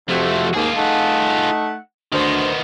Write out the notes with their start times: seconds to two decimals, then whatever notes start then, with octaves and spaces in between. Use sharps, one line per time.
0.10 F2 C3 F3 A3 F#4
0.54 D#2 G#2 A#3 F4 G#4
0.77 A3 D#4 F#5
2.13 D2 D#3 B3 C5